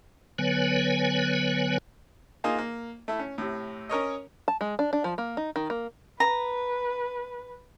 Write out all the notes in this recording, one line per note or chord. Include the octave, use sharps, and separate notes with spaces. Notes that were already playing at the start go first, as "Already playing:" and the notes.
D3 F#3 B3 B4 C#5 G#5
A#3 D#4 F4 G#4
A#3
A3 E4
C#4
A2 C3
C#4 A#4 C#5 D#5
A5
G#3
D4
D4
F3
A#3
D#4
D#3
A#3
B4 A#5